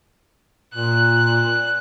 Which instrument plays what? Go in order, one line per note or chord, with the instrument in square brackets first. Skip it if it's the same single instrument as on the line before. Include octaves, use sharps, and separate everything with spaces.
[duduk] A#2 [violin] F#6